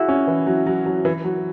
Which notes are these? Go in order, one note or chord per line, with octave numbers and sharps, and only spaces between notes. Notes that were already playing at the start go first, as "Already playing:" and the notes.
Already playing: E4 F#4 G#4
C#4
E3
F#3
F#3
F#3
E3
F#3